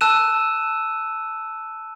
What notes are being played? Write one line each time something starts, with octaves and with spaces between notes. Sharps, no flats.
A5 E6 F#6 D#7 E7